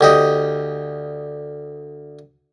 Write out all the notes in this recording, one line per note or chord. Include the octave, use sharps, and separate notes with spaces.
D2 G4 D#5